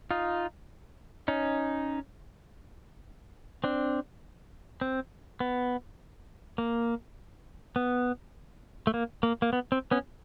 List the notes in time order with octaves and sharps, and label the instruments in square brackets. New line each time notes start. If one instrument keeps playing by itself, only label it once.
[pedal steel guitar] D#4 F4
C#4 D#4
C4 D4
C4
B3
A#3
B3
A3
A#3
A#3
A#3
B3
C4
B3 C#4